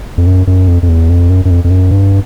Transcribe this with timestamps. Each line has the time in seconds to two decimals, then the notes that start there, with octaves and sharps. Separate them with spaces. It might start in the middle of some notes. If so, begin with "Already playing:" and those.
0.18 F2
0.27 F#2
0.47 F#2
0.68 F2
0.83 F2
0.89 E2
1.09 F2
1.30 F#2
1.45 F#2
1.50 F2
1.64 F2
1.70 F#2
1.91 G2